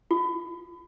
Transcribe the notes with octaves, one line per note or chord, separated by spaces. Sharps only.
F4